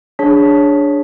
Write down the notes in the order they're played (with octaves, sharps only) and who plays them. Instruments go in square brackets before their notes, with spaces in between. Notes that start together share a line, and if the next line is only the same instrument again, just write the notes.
[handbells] D4 G#4 C#5 A5 B6